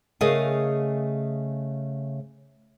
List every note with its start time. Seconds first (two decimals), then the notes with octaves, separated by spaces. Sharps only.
0.21 C#3 A3 G#4 A#4 D#5 F5